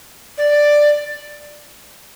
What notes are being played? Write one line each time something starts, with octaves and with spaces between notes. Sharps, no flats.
D5